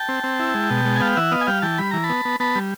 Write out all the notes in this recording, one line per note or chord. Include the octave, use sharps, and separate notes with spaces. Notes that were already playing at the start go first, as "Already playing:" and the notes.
Already playing: G5 A5
C4
C4
E4
G#3
B2
G#3
G#5
B3 F5 G5
E3 E5 F#5
B3 D#5 F5
G#5
G3 F5 G5
E3 G5 A5
G3 B5
E3 A#5
A5 B5
B3
B3
B3 A5 B5
G3